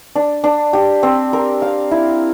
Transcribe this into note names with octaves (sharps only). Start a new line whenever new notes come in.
D4
D4
G4
C4
A#4
F5
E4